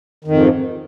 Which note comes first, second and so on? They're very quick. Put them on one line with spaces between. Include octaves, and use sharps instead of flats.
D#3 F2 G#2